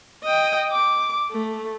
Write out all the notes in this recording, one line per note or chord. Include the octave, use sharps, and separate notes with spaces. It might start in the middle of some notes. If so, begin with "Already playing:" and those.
D#5 G5
D6
A3